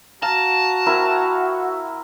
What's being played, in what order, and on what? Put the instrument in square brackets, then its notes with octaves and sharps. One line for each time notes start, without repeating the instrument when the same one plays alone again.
[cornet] F#4 [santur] F5 [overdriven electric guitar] A5 [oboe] A#5
[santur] C4 E4 A#4